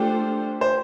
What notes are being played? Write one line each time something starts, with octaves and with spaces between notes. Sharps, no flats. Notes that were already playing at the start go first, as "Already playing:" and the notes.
Already playing: A3 D4 F4 G4 A4 C5
C5